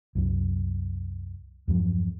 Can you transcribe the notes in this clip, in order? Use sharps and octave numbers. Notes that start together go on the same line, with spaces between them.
C2 F#2 F#3
E2 G2 F3 F#3